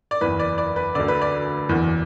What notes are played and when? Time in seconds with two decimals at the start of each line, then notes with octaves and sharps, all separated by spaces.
0.11 D5
0.21 F#1 E2 E3 B4
0.39 D5
0.58 D5
0.76 B4
0.95 D2 D3 D5
1.08 B4
1.21 D5
1.69 F#1 E2 E3